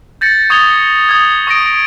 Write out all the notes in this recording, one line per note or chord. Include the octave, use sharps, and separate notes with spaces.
G6 A6 A#6 C#7
C#6 D#6 G#6 C#7 F7 G7
D#6 G#6
C#6 D#6 A#6 D7